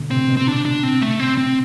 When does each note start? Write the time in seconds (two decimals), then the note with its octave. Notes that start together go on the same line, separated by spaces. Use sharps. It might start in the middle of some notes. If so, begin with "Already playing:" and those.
Already playing: B2 D3
0.11 A2 C3 C4
0.29 B2
0.37 C4
0.47 D4
0.65 D4
0.83 C4
1.01 A3
1.20 C4
1.37 C4